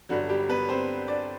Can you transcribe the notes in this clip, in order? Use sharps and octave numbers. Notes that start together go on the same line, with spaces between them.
G1 G2 D3 F#3 F#4
G3 G4
B3 B4
C4 C5
D4 D5